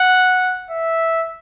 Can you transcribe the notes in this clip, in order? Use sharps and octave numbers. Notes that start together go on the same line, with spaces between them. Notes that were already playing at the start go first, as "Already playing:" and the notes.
Already playing: F#5
E5